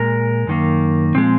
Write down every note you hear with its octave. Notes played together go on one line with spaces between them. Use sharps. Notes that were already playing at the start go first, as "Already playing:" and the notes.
Already playing: A#2 G#3 A#4
F#2 D#3 A#3
A#2 F3 G#3 C4